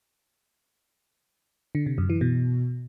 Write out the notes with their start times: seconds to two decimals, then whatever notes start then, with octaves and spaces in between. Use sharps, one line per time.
1.75 D3
1.86 C3
1.98 F#2
2.10 E3
2.21 B2